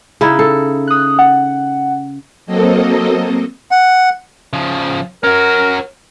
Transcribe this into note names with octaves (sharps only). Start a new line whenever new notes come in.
C#3 D#4 E4
A4
D#6 F#6
F#5
F#3 A#3 C4 A4 D#5
F#5
C#3 F3
C#4 F#4 A#4